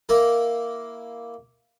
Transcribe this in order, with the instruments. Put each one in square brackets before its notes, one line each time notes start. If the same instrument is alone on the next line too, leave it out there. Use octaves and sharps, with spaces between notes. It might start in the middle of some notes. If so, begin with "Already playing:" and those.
[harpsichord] A#3 E4 A#4